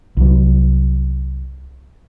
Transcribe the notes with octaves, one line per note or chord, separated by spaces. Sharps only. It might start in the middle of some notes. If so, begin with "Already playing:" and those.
C2 F#3